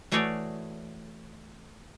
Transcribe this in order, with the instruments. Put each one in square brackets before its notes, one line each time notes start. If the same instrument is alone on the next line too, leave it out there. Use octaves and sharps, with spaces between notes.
[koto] E3 A3 F#4 G#4 C#5 D5